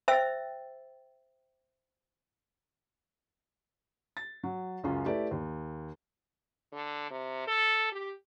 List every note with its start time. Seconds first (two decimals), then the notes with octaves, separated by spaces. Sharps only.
0.08 C5 E5 G5 E6 A6
4.17 A6
4.43 F#3
4.83 C#2 F#2 C#4 F4
5.06 A3 E4 G4 B4 D5
5.31 D#2
6.73 D3
7.11 C3
7.47 A4
7.92 G4